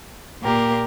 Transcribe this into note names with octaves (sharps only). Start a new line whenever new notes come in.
A#2 A#3 G4 A#4